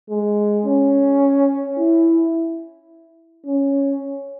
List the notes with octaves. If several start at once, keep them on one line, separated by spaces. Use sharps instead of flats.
G#3
C#4
E4
C#4